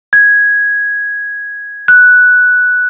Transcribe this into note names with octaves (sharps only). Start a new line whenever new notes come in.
G#6
F#6